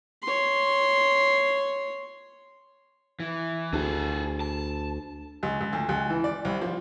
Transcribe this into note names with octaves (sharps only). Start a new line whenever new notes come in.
C#5 C6
E3
D2 G#4 A4
A5
C#2
C#2
D2
C#2
E3
D5
C2
F3